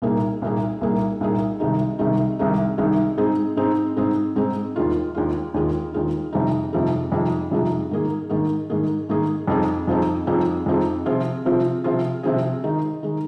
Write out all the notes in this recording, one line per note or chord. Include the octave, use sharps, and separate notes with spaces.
C2 A#2 A#3 D#4 G#4
C2 A#2 A#3 D#4 G#4
C2 A#2 A#3 D#4 G#4
C2 A#2 A#3 D#4 G#4
C2 C3 D#3 G#3 D#4
C2 C3 D#3 G#3 D#4
C2 C3 D#3 G#3 D#4
C2 C3 D#3 G#3 D#4
G#2 G#3 C4 D#4 G#4
G#2 G#3 C4 D#4 G#4
G#2 G#3 C4 D#4 G#4
G#2 G#3 C4 D#4 G#4
D#2 D#3 G#3 F4
D#2 D#3 G#3 F4
D#2 D#3 G#3 F4
D#2 D#3 G#3 F4
F2 C3 F3 G#3 D#4
F2 C3 F3 G#3 D#4
F2 C3 F3 G#3 D#4
F2 C3 F3 G#3 D#4
G#2 D#3 A#3 G#4
G#2 D#3 A#3 G#4
G#2 D#3 A#3 G#4
G#2 D#3 A#3 G#4
F2 F3 C4 D#4 G#4
F2 F3 C4 D#4 G#4
F2 F3 C4 D#4 G#4
F2 F3 C4 D#4 G#4
C3 F3 C4 F4 G#4
C3 F3 C4 F4 G#4
C3 F3 C4 F4 G#4
C3 F3 C4 F4 G#4
D#3 G#3 D#4
D#3 G#3 D#4